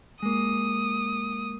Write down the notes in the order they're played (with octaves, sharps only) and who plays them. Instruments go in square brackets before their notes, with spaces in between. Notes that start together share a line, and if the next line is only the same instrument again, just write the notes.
[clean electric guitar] G#3 A#3 [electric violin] D#6